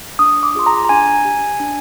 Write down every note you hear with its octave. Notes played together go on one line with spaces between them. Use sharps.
D4 D#6
D6
F4 G#4 C6
A#5
A#5
D4 G#5
G4
D4